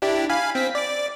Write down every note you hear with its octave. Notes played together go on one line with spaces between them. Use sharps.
D4 E4 G4
F5 G#5 B5
C4 B6
D5 D6